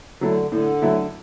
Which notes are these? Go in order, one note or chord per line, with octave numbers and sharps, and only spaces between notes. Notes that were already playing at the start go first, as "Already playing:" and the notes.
D3 F#3 A3 E4
A2 D3
F#3 A3 E4